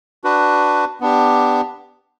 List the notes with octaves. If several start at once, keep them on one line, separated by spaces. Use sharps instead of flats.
D4 F#4 B4
B3 D4 G4